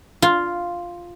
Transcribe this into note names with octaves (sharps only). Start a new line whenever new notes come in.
F4